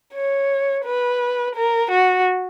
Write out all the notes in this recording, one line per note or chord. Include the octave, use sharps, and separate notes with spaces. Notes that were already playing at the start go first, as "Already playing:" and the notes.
C#5
B4
A#4
F#4